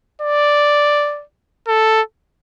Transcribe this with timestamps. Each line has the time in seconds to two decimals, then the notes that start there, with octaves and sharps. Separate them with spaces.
0.22 D5
1.67 A4